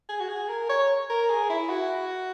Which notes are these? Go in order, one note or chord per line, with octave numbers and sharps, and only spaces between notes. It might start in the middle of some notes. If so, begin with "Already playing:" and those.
G#4
F#4
G#4
A#4
C#5
A#4
G#4
E4
F#4